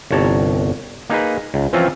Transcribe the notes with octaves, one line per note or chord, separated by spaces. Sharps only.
G1 C2 C#5 A5 A#5
A#3 D#4 G#4 B4
C#2
E3 F3 C4 C#4 F4